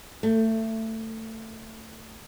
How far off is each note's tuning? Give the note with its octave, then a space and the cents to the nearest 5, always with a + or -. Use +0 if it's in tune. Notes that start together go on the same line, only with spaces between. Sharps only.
A3 +20